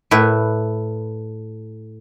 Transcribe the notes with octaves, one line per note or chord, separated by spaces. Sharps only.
A2 B4 E5